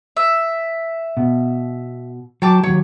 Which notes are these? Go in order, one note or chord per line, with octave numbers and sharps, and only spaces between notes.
E5
B2
F#3 G5 A5 D6
D#2 F#3 C#5